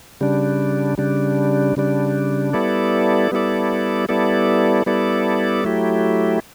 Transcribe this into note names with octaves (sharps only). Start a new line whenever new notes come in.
C#3 G3 D4
C#3 G3 D4
C#3 G3 D4
G3 B3 E4 A4 D5
G3 B3 E4 A4 D5
G3 B3 E4 A4 D5
G3 B3 E4 A4 D5
F#3 A3 E4 G4